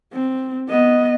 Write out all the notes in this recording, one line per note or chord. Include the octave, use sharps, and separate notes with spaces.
C4
B3 D#5